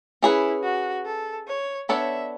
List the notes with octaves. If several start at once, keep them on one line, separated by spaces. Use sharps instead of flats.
C#4 E4 G#4 B4
F#4
A4
C#5
B3 D4 A4 C#5 E5